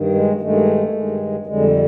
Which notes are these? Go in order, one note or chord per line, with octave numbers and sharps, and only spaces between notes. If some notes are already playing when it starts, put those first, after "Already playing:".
Already playing: G2 D#3
G#3
G2 D#3 G#3 A3
G2 D#3 G#3
F2 D3 G3 G#3